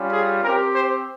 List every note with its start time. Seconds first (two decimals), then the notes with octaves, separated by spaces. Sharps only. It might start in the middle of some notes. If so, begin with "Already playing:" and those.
Already playing: G3 C#4 F4
0.13 G#4
0.43 C4 G4 A#4
0.73 C5